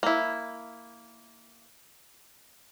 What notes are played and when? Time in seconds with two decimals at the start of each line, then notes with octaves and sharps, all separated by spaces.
0.03 A#3 E4